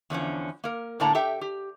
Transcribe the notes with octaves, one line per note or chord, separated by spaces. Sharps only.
E2 D3 F3 C#4
A#3 A#4
A2 D3 A#3 D5 A5 A#5
G4 A4 E5 G5
G4